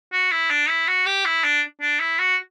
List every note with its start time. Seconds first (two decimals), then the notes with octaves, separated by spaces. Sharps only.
0.13 F#4
0.31 E4
0.50 D4
0.69 E4
0.88 F#4
1.06 G4
1.25 E4
1.44 D4
1.81 D4
2.00 E4
2.19 F#4